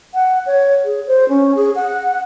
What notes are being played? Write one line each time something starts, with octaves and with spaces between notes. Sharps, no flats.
F#5
C#5
G#4
C5
C#4
G#4
F#5